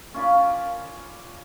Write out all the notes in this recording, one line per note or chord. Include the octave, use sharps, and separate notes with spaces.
C#4 F4 D5 B5